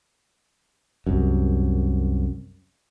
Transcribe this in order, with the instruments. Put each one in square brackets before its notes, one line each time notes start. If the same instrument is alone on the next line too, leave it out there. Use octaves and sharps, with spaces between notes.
[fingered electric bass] C2 F#2